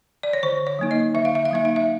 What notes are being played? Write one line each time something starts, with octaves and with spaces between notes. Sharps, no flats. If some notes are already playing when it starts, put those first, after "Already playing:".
D5
C#5
D3 C5
C#5
F#3 A#3 D#4
D#5
D3 E5
F5
E5
F5
F#3 A#3 D#4 E5
F5
E5